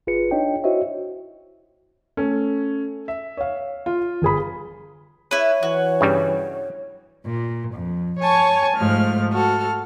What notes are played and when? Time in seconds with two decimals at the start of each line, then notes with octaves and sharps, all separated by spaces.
0.07 G1 F4 G#4 B4 C#7
0.31 D4 D#4 C#5 D#5 G5
0.64 E4 F#4 C5 C#5 D#5 E5
2.17 A3 C#4
3.08 E5
3.37 C#5 F5
3.86 F4
4.22 G1 G#4 B5
5.31 E4 B4 C#5
5.63 E3 F#4
6.01 G2 C#3 G3
7.25 A#2
7.74 F2
8.20 C#5 G#5 A5 C#6
8.76 G#2 F3 A3 F6
9.32 F#4 A4 F6